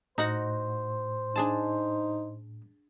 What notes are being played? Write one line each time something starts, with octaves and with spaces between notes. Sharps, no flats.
A2 D#4 F#4 C5 F#5
D4 D#4 G#4 A5